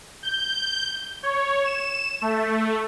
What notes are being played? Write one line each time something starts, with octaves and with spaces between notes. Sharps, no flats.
G6
C#5
E7
A3